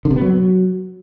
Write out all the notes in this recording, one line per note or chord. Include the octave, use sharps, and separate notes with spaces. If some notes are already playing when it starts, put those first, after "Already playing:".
D3
C3
B3
F#3